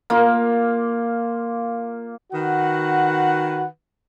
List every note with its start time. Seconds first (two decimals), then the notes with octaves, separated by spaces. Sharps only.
0.10 A#3 F4
2.33 D#3 F#4 B4 F#5